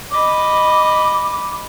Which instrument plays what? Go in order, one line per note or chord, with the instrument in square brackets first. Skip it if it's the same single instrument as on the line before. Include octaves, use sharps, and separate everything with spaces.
[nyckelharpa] D#5 B5 [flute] D6